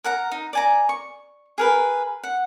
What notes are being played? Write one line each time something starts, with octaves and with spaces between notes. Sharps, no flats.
A#4 F#5 A#5
D#4
D5 G#5 A#5
C#6
G#4 A#4 B4
F#5